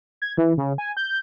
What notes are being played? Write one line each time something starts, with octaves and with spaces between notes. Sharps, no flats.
G#6
E3
C#3
G#5
G6